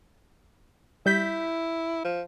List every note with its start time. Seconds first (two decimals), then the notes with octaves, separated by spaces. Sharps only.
1.06 G3 E4 G6 B6
2.04 F3